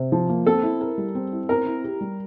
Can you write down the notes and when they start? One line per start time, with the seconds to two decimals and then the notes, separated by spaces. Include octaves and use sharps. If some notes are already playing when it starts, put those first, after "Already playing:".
Already playing: C3
0.12 F3
0.29 A#3
0.46 C4 A4
0.63 E4
0.81 A#4
0.98 G3
1.15 C4
1.32 E4
1.49 C4 A#4
1.66 E4
1.84 G4
2.01 G3